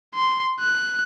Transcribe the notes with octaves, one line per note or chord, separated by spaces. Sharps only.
C6
F#6